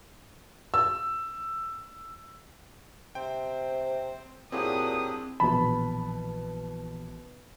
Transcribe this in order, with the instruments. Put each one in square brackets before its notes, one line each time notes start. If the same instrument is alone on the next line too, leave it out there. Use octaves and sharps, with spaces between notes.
[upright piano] E6
[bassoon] C3 [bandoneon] C4 C5 [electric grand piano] G5
[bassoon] A#2 [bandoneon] F#3 D4 G4 [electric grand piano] C4 E4 G#4 [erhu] D#6
[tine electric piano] A#1 E3 A5 [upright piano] B2 B5